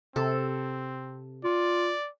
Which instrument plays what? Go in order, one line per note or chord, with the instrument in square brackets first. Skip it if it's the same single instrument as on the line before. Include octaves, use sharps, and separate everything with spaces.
[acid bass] C3 [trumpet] C4 [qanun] A4
[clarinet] F4 [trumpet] D5